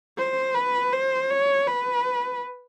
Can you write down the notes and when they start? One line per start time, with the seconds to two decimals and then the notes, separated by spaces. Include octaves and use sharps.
0.18 C5
0.55 B4
0.93 C5
1.30 C#5
1.67 B4